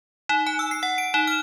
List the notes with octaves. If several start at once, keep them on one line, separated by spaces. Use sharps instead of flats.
D#4
G#5
E6
C7
F#5
D7
D#4
F6